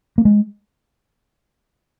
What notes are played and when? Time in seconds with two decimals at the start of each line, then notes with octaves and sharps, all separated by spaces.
0.18 A#3
0.25 G#3